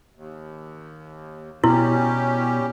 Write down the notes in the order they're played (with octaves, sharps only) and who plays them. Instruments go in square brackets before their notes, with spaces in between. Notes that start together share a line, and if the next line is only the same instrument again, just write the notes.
[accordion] D#2
[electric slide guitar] B2 [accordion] G3 C#4 G4 [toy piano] E4